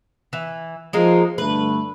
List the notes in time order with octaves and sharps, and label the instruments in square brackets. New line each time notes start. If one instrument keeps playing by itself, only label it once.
[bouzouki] E3
[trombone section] F3 [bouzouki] G#3 A#3 D#4
[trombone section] G2 D3 A3 [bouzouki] B4